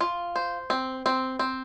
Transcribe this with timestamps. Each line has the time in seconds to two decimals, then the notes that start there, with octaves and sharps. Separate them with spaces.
0.01 F4
0.36 C5
0.70 C4
1.06 C4
1.39 C4